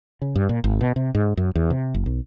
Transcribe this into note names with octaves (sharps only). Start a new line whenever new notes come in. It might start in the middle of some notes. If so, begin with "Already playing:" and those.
C#3
G2
A#2
G#1
B2
C3
G#2
F#2
E2
C3
F#1
B1